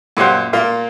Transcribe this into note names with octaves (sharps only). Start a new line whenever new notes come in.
F#2 A#2 G4 C5 F#5
A#2 A#3 F4